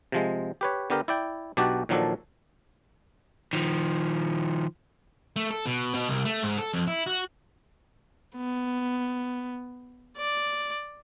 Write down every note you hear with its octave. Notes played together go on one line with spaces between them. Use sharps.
C3 F3 G#3
G4 B4 C#5
D3 B3 G4 A#4
E4 D5 G5
B1 B2 D4 F#4 G4 D5
A#2 D#3 F3 F#3 D4 A4
D#3 F3
A3
A4
B2
B2
C2
A3
G#2
A4
F2
E4
F#4
B3
D5